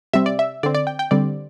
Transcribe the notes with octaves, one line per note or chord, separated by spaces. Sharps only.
C3 G3 C4 E5
D5
E5
D3 C4 D5
D5
G5
G5
D3 G3 C4 D5